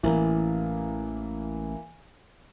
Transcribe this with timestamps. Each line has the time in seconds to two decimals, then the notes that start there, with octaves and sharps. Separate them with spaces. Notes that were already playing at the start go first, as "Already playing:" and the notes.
0.03 A1 E3 A#3